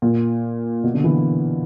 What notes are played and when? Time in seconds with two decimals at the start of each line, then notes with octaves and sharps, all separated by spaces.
0.02 A#2
0.84 B2
0.94 D3
1.04 E3